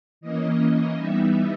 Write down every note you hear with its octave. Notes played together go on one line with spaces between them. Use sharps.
E3 A#3 C#4 D#5
E3 G3 B3 D#4 E5